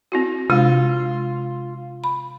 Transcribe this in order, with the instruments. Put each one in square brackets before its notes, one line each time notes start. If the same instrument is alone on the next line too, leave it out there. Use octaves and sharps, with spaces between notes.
[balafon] C4 E4 F#4
[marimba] C3 [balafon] G#3 D4 [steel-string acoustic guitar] F4
[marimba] B5